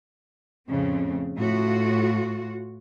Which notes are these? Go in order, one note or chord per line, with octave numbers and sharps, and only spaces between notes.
F2 A2 C#3 C4
A2 F4 F#4